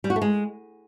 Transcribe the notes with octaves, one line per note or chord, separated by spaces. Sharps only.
G3
F#4
A3
G#3